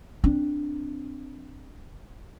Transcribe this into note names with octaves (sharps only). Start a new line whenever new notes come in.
C4 D4